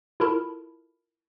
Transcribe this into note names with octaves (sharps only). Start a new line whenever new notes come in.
E4 F4 A4 A#4 A5 B5